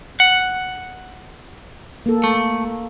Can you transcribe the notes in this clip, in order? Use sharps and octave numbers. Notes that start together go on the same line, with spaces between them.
F#5
A#3 A4
A3